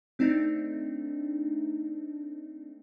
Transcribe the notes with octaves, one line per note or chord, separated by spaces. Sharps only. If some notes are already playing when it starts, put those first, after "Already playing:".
A3 C4 D4 D#4